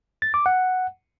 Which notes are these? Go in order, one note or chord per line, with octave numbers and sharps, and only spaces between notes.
A6
D6
F#5